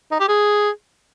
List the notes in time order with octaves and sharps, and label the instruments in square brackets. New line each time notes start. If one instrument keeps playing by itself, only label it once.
[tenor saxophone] D#4
G4
G#4